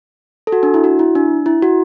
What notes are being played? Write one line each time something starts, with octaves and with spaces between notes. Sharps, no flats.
A4
F#4
D4
E4
F#4
E4
D4
E4
F#4